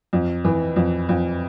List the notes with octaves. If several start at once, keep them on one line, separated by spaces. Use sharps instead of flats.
F2
E3
F2
F2